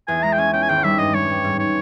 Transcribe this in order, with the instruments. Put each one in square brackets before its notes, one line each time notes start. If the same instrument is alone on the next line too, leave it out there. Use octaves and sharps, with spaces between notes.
[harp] E2 [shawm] G#5
[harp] G#3 [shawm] A#5
[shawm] G5
[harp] C#4 [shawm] G#5
[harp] C#4 [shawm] G5
[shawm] G#5
[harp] G#1 [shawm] G5
[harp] G3 [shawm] E5
[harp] G2 [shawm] D#5
[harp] G3 [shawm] C#5
[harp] G3
G#2
[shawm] C#5